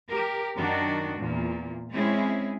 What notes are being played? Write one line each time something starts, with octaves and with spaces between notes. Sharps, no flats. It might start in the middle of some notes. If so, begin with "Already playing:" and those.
G4 A#4
F#2 D#3 D4 F#4
E2 A#2
G#3 C4 C#4 E4 G#4